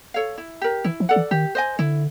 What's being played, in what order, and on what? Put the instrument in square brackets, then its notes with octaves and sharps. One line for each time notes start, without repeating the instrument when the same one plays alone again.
[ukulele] A4 C#5 F5
E4
G4 A#4
[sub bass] E3 [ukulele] E4
[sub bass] F3
[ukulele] A4 D5 F#5
[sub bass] E3
[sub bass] D#3 [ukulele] G4
[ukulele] C5 D#5 G#5
[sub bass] D3 [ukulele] E4